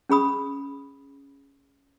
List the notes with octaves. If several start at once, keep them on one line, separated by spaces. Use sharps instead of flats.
C#4 G#4 B5 D#6